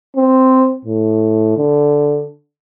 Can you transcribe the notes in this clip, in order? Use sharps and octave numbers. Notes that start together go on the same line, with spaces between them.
C4
A2
D3